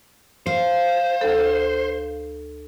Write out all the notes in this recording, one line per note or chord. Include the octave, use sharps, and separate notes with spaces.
C5 F5
D2 A4